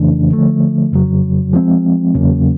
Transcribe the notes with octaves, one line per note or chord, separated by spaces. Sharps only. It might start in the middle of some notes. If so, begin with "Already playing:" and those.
Already playing: F2 C#3 E3 A3 D4
D3 F3 A3
F2 C#3 F#3
F3 G#3 C4
E2 C#3 F#3 A#3 C#4